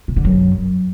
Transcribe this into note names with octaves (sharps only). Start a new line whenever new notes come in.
C3
D3
F#2